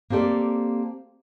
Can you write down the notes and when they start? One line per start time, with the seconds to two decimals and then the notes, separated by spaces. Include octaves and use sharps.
0.10 A#3 C4 G4 A4 D5